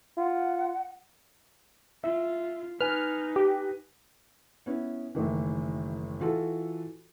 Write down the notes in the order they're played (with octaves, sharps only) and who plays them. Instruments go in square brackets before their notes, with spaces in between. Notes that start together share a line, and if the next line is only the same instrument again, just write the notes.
[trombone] F4 [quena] F#5
[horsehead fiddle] F4 [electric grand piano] E5
[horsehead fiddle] D#4 [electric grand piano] B4 G#5 [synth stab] F6
[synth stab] G4
[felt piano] B3 C#4 E4
F#1 A2 D#3 E3
E3 F4 F#4 A4